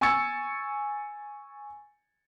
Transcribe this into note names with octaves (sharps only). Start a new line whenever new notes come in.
G#5 C#6 E6 G#6 A6 C#7